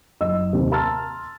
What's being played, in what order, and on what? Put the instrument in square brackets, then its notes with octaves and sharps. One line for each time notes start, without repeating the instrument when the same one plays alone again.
[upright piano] F#1 D#5 E6
D#2 C3
A5 A#5 C6 E6 F6 A6